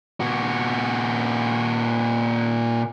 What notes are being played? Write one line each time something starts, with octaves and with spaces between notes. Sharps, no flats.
A#2 F#4